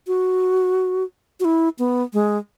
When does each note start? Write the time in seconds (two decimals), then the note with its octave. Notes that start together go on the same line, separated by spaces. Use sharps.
0.07 F#4
1.40 F#4
1.45 E4
1.79 B3
2.13 G#3